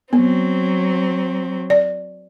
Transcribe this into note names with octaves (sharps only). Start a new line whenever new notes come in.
F#3 B3 C4
D5